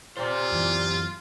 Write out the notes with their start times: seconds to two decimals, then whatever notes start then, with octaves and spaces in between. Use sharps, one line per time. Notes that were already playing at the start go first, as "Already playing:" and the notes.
0.17 A#2 F4 G4 C5
0.52 F#2 E3